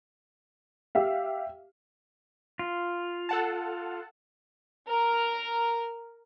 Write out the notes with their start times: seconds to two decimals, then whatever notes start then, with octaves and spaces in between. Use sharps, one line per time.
0.95 G4 E5 F5
2.59 F4
3.29 A4 F#5 A5
4.89 A#4